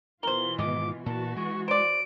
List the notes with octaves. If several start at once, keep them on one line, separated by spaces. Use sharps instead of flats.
B2 E3 F4 A#4 C5 G7
G#2 D#3 D#5 D6
A#2 E3 F#4 A5
G#3 C#6
C5 D5 D7